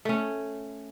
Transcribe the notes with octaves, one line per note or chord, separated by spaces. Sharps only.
A3 C#4